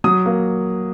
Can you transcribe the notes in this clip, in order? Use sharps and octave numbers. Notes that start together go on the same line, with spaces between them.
F#3 D#6
A#3